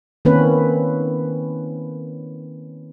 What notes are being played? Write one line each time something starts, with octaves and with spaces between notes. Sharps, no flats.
D#3 A#3 C4 C#4 B4